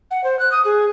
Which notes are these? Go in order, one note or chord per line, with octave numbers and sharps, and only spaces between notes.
F#5
C5
F#6
D#6
G#4